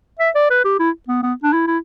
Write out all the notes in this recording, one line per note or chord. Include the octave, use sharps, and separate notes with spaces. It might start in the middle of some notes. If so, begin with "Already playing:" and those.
E5
D5
B4
G4
E4
B3
B3
D4
E4
E4